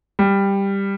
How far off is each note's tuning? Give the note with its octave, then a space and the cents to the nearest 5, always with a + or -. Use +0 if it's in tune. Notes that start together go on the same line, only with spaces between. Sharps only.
G3 +10